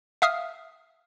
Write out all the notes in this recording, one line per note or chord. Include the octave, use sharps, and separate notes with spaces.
E5 F5 D#6 F6